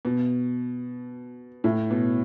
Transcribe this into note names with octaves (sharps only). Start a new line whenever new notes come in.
B2
A2
B2